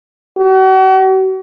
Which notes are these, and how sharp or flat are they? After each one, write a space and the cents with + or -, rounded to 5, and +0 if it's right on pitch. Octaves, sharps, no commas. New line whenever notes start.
F#4 +40